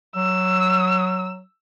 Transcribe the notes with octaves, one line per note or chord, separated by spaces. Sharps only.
F#3 E6